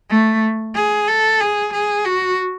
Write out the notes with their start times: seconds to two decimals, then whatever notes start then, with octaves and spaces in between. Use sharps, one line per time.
0.10 A3
0.75 G#4
1.08 A4
1.40 G#4
1.73 G#4
2.05 F#4